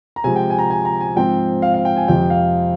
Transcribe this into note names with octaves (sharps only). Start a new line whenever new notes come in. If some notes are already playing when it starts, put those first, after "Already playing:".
A#5
C3 F3 G#3 G#5
G5
G#5
A#5
G#5
A#5
G#5
G#2 F3 C4 G5
F5
F5
G5
G#5
F2 C3 F3 G5
F5